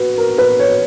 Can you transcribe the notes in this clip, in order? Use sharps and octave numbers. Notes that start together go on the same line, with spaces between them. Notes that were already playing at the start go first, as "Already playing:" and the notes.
Already playing: F#4 B4
A#4
B4
C#5